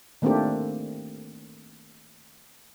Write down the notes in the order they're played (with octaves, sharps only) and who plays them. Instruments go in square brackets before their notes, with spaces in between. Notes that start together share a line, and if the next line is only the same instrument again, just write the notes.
[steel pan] D#3 A3 A#3 C4 D4 G4